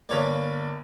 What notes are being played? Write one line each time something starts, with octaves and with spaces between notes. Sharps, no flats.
G1 A#3 B4 C#5 D5